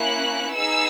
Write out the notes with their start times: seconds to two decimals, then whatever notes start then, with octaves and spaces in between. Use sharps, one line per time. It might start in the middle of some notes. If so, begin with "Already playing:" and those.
Already playing: A#3 C#4 E4 F#6
0.52 B3 D#4 G#4 E6